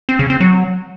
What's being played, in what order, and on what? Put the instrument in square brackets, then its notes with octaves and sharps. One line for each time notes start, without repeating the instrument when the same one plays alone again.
[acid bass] C4
C#3
C4
F#3